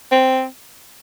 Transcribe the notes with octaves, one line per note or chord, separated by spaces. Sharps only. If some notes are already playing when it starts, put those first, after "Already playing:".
C4